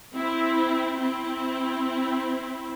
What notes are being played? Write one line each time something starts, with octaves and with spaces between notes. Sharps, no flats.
C4 E4
C4 E4